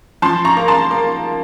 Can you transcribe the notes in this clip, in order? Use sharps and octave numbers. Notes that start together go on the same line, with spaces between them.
F3 A5 C6
A#5 C#6
A#3
A5 C6
A#3